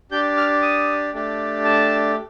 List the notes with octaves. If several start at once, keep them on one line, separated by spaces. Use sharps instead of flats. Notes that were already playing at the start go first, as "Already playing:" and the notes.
D4 G4 G6
F6
D#6
A3 D4 G4
A5